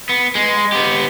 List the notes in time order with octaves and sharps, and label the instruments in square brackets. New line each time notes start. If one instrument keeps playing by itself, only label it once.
[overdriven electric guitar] B3
G#3
B3 G4